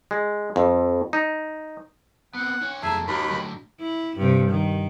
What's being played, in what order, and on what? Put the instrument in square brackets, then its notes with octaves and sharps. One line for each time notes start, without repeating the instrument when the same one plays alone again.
[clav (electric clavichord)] G#3
F2
D#4
[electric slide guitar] B3 C4 [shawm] F#5
[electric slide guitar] D4 C#5
[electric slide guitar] F2 E3 A3 [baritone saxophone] G#4 [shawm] E5 [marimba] A5 A#5
[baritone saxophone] D#2 [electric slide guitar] G#3 F#4 A#4 [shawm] B5
[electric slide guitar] A2 D3 F#3
[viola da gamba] E4
G2 C3
D#3